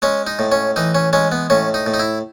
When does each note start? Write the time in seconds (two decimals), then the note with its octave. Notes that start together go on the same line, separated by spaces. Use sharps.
0.02 G#3 C#4
0.27 D#4
0.39 A2
0.52 C#4
0.76 E3 D#4
0.95 C#4
1.13 G#3 C#4
1.32 B3
1.50 A2 C#4
1.74 D#4
1.86 A2
1.94 D#4
1.99 E4